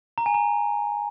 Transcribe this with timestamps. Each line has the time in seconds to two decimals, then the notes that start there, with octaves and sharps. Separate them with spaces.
0.18 A#5
0.26 G#5
0.34 A#5